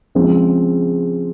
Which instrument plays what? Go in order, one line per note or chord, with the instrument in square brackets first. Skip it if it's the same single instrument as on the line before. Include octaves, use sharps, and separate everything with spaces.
[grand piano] C#3 F3 G#3 C4 F4